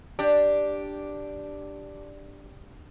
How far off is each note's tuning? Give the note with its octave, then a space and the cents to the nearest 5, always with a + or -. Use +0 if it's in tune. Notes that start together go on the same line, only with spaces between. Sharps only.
D4 +0 G4 +0